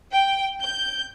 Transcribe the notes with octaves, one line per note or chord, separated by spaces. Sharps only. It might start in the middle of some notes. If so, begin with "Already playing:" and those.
G5
G6